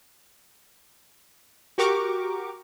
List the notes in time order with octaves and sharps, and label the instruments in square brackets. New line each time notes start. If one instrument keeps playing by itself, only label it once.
[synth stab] F#4 G4 A#4 C#6 D6